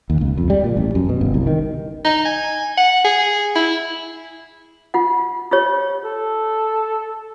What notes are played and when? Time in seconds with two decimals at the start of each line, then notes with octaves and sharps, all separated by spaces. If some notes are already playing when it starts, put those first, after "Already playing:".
0.10 D#2
0.21 C#2
0.38 F2
0.50 G3
0.64 A#2
0.77 A1
0.95 F#2
1.09 B2
1.21 G1
1.34 C2
1.47 D#3
2.04 D#4
2.25 G#5
2.77 F#5
3.05 G#4
3.56 E4
4.94 F4 F#5
5.51 F4 G4 C#5
6.04 A4